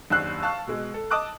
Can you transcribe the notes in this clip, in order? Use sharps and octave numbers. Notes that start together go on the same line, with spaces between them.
F#1 D#2 D4 E6 F#6 C7
F5 A5 C#6 E6 F#6
B2 G#3
A4
D#5 A5 D6 D#6 F#6